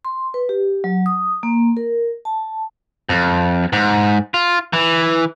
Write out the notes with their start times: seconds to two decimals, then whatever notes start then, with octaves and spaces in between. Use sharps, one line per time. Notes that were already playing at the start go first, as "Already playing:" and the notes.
0.05 C6
0.34 B4
0.49 G4
0.84 F#3
1.06 D#6
1.43 A#3
1.77 A#4
2.25 A5
3.09 F2
3.73 G#2
4.34 F4
4.73 E3